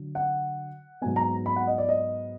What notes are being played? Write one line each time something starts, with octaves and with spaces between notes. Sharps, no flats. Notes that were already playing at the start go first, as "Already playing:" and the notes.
Already playing: D3 F#3
F#5
G#2 F#3 B3 G#5
A#5
B5
F#5
D#5
D5
D#5